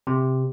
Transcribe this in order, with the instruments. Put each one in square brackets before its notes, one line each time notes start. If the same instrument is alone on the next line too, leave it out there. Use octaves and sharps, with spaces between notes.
[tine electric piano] C3